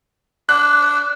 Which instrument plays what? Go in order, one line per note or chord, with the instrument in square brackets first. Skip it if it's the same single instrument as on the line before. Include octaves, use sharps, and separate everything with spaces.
[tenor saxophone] D4 [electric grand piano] F#6